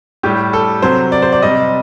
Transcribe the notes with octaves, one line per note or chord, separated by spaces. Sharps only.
A2 G3 G4
A4
C3 F#3 C5
D5
C5
D5
C3 G3 D#5